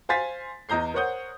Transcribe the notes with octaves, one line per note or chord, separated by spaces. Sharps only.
C5 F5 G#5 C6 A6 B6
E2 D#5 A#5 G6 C7
A#4 C5 C#5 F#5 D#6 G6